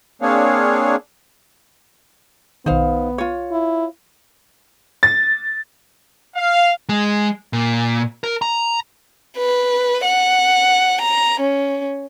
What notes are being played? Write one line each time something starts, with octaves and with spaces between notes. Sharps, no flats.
A#3 C4 D4 G#4 C#5 F5
B1 D#3 B3 D#4 C5 F5
F4 C#5
E4
A6
F5
G#3
A#2
A#4
A#5
B4
F#5
A#5
C#4